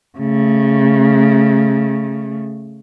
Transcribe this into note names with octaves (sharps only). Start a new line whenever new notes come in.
C#3 A3